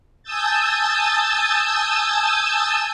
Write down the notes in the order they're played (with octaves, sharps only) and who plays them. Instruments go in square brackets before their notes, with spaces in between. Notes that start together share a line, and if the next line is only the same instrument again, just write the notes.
[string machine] G#5 A5 D#6 E6 G6 A6